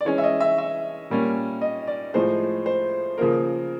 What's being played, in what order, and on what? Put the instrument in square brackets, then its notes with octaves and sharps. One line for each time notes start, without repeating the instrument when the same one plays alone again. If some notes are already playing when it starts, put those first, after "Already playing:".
[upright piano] D5
E3 G#3 C#4 C#5
E5
D#5
E5
E5
A#2 G3 A#3 C#4
D#5
D5
A2 F3 G#3 C5
C5
C#3 F3 A#3 A#4